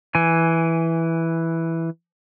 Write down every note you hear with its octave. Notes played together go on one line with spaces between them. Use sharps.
E3 G#5